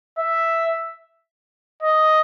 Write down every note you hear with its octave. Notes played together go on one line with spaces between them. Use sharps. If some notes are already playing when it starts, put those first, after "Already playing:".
E5
D#5